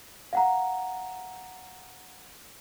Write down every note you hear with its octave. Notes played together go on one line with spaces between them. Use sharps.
F5 F#5 A#5